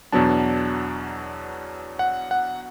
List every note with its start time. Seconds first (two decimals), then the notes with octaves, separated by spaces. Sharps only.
0.12 E2 B2 F#3 B3 D4 A5
1.99 F#5
2.31 F#5